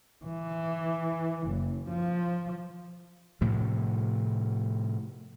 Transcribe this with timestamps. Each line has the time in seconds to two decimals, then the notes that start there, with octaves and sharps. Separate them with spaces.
0.25 E3
1.48 F#1
1.89 F3
3.41 A2 C3 F3